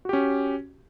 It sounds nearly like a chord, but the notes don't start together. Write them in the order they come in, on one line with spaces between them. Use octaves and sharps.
F#4 G4 C#4